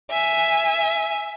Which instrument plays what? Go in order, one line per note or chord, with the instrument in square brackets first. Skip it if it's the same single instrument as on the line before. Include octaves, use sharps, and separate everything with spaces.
[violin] E5 G#5